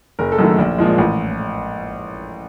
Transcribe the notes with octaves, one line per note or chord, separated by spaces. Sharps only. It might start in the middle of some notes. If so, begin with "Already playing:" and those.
F#1 A#4
A4
F#2 D#3 F#3 A3
A#1
A#2 F3 G#3
A1